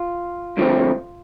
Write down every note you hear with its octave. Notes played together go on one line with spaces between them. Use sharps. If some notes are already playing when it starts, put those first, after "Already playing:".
Already playing: F4
G2 D3 F3 A3 C4